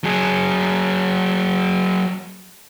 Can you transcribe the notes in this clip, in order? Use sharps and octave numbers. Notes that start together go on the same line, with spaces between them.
F#3 G#4